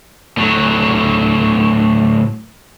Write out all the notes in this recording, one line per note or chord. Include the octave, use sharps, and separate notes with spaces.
A2 F#3